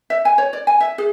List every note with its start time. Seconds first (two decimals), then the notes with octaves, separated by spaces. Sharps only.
0.10 E5
0.25 G#5
0.38 C#5
0.53 D5
0.67 G#5
0.80 E5
0.98 G#4